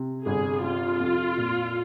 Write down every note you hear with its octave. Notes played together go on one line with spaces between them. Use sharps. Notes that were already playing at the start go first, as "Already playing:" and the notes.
Already playing: C3
G1 G#4
C3 F4
F2
A#2